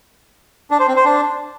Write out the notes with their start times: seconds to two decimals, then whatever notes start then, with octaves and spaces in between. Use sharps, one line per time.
0.71 D4
0.79 C5
0.88 C4
0.96 C5
1.05 D4